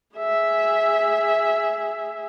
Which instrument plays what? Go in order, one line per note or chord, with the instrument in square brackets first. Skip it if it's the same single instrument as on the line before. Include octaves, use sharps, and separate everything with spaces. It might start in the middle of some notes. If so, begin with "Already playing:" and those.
[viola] G#4 E5